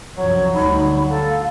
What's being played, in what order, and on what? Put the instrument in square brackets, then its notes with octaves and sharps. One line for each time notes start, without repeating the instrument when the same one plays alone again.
[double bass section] C2 F#2 F3 [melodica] F#3 [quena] C#5
[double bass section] D2 D3 G3 [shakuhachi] D#4 [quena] B5
[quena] A4 [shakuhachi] F5